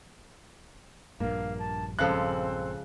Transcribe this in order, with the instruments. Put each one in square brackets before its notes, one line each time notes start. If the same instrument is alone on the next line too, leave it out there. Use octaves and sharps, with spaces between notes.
[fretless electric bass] A#1 G2 [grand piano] A#3 [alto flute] F5
[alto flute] A5
[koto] C#3 F3 G#3 [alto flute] C4 [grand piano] A4 F#6